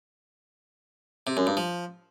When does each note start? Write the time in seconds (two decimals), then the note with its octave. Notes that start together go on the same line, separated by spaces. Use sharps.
1.27 C3
1.37 F#2
1.47 G2
1.57 F3